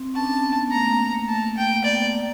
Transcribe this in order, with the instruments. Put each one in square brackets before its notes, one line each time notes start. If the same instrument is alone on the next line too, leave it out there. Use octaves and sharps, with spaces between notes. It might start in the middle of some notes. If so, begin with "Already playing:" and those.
Already playing: [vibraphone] C4
[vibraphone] C#4 [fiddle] A5
[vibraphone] D4
C#4
B3
B3
A#3
[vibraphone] A3 [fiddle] A#5
[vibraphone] A#3
A#3
A3
[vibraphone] A#3 [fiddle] A5
[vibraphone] A#3
[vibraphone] A3 [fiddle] G5
[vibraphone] A#3
[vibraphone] B3 [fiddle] D5
[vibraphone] A#3